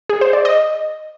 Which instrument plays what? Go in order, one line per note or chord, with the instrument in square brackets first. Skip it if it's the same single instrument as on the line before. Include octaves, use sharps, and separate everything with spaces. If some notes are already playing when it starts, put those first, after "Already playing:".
[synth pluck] G#4
C5
D5
D#5